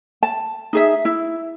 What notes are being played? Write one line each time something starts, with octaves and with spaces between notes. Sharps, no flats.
A5
D#4 G#4 E5
E4